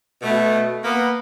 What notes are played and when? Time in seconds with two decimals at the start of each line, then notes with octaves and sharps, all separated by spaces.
0.22 B2 A3
0.84 A#3 B3